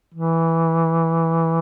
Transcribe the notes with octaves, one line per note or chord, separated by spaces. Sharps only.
E3